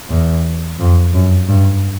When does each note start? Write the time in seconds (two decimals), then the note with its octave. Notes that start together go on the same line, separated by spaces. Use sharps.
0.10 E2
0.80 F2
1.14 F#2
1.49 G2